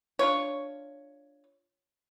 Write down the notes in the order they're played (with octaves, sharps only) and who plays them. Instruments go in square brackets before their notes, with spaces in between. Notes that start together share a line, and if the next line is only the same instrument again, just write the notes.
[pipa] D4 F4 C#5